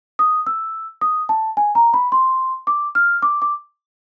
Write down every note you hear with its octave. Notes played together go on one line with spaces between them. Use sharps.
D#6
E6
D#6
A5
G#5
A#5
B5
C6
D6
F6
D6
D6